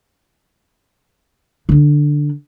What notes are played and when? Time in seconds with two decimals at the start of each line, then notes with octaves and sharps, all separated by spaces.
1.69 D3 D4